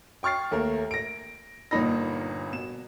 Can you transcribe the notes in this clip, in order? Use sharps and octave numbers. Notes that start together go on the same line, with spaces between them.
G5 C#6 F6 A6 C7
D#2 A3 A#4
A#6 D7
G1 A#2 A#3 D#4 B5 A#6
B2 E7